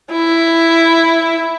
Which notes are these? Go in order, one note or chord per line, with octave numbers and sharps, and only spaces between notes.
E4